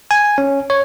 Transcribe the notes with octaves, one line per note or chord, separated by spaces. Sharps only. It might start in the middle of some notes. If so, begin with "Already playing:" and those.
G#5
C#4
C#5